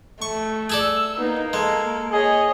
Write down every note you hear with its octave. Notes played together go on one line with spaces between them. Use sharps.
A3 C#6
G#4 A4 D5 E6
A#3 B3 D#4
G#3 A4
G#4 C#5 D#5